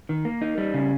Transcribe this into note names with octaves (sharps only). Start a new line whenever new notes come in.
D#3
A#3
D#4
G3
C#3